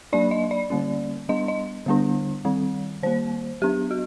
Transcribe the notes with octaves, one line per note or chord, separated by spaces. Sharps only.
F#3 A#3 D4 D5
D#5
D5
D3 G3 A#3 C#4
G3 B3 D4 D#5
D#5
D3 G3 B3 D4
D#3 G3 C4
D#3 G3 A#3 C5
F#3 B3 D4 G4
F#4